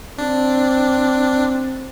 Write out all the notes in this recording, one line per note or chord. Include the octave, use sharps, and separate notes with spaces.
C4 D4